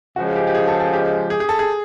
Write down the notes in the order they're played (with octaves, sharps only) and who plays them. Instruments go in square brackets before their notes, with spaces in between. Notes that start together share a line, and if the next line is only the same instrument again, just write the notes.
[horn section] C#3 F3 G#3 [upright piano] F#4
[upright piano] G4
G4
G#4
A4
A4
G4
G#4
G#4
A4
G#4